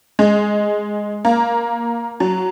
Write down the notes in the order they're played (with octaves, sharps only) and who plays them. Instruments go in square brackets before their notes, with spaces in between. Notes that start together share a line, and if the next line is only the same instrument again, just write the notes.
[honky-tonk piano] G#3
A#3
F#3